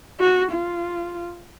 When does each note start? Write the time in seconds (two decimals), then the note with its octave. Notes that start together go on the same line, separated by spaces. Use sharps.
0.20 F#4
0.52 F4